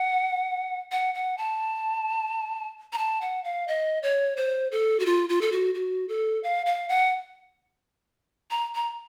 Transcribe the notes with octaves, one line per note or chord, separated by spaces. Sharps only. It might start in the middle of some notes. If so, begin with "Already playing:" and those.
Already playing: F#5
F#5
F#5
A5
A#5
A5
F#5
F5
D#5
C#5
C5
A4
F#4
F4
F4
A4
F#4
F#4
A4
F5
F5
F#5
A#5
A#5